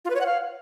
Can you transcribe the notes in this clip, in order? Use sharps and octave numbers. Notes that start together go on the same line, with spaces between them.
F4
B4
C#5
F#5
F5